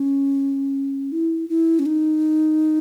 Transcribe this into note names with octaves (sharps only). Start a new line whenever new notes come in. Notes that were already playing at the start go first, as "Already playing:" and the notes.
Already playing: C#4
E4
E4
C#4
D#4